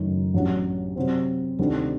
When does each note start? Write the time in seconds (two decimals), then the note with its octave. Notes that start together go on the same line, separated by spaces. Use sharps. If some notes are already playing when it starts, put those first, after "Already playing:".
Already playing: F#1 F#2 D#3 F#3 A3
0.34 A1 G2 F#3
0.96 C3 F#3 C4
1.59 D2 C3 D#3 G3